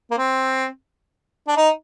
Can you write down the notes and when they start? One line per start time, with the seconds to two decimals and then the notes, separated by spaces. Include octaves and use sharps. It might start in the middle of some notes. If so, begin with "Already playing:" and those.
0.11 A#3
0.18 C4
1.48 D4
1.57 D#4